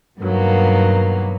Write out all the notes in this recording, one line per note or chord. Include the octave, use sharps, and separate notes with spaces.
G2 B2 D#3 F#3 A#3 B3